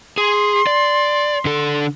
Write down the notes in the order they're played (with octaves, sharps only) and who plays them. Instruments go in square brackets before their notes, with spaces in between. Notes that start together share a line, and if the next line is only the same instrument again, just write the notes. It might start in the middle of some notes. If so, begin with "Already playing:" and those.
[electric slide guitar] G#4 [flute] C6
[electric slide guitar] D5
D3 A4